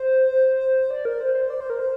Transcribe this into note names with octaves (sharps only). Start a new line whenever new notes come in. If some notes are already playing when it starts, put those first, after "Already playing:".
Already playing: C5
D5
A#4
C5
C5
D5
C5
A#4
C5